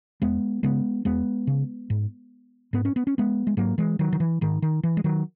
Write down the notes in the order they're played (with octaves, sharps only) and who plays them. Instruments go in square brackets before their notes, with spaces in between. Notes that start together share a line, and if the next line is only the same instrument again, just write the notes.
[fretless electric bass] E2 G#3 B3
C#3 G#3 B3
E2 G#3 B3
C#3
G#2
G#2 B3
C#4
B3
C#4
G#3 B3
G#3
G#2 F#3 A#3
E3 G#3
D#3 F#3
D#3
E3
G#2 D#3
D#3
E3
G#3
D#3 F#3